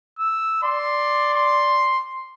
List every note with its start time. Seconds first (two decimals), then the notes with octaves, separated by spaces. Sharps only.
0.19 E6
0.63 D5 C6
1.35 C6